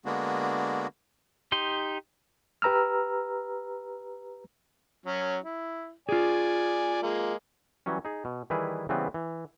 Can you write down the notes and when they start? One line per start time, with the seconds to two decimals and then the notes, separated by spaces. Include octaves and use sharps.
0.05 D3 G#3 A#3 B3 D4 F#4
1.52 D#4 G4 C6
2.62 G4 B4 A#5 E6 F6
5.06 F#3 C#4
5.43 E4
6.09 F4 G#4 D5 G#5
7.03 G#3 A#3
7.86 E3 F#3 G3 C#4
8.05 D#4 G#4
8.25 B2
8.50 D#3 E3 G3 E4 G#4 B4
8.89 C#3 E3 G3 B3 C4 B4
9.14 E3